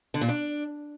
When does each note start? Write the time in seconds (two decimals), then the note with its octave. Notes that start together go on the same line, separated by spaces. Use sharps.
0.14 D3
0.21 A#2
0.29 D4